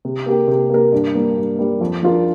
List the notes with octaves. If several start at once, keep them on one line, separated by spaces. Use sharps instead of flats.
C3
A#3 G4 A#4
C3
A#3 G4 A#4
G2
G3 A#3
G2
G3 A#3
F2
F3 D4 F4 A#4